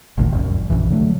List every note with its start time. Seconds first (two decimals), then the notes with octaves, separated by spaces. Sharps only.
0.17 G#1 D2 A#2 D#3
0.32 F1 C2 F#2
0.70 A#1 F#2 E3
0.90 D3 F#3 A3